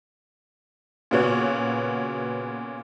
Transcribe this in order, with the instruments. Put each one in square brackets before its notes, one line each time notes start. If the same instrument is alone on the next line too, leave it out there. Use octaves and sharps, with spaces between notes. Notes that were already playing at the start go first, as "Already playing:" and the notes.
[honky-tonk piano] A#2 C#3 B3 F#4 C#5